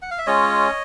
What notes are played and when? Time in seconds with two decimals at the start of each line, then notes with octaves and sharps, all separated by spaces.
0.02 F#5
0.11 F5
0.18 E5
0.27 G#3 C#4 F4 C#5 D#5